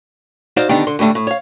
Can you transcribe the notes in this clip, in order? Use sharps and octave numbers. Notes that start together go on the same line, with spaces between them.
D#4 F#4 C5 D5 F5
D3 D#3 B3 D4 D#4 G4
D3 C6
A2 D3 G3 A3
A2
C#5 F5